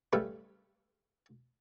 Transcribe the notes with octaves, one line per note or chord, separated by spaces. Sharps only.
C#3 G3 A3 A4 B4